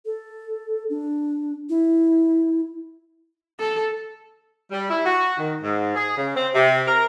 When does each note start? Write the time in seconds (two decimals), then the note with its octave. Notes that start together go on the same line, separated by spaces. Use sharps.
0.06 A4
0.90 D4
1.69 E4
3.60 A4
4.71 G3
4.90 E4
5.05 F#4
5.38 D#3
5.62 G#2
5.96 G#4
6.17 C#3
6.35 C4
6.54 C3
6.87 A#4